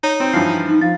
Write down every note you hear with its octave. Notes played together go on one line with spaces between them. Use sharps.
D#4 C#5
C4
G2 E3 F3 C7
D#4
F3 F5 A6